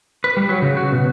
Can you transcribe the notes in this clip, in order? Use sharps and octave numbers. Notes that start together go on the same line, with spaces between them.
B4
G3
F#3
C#3
F#4
B2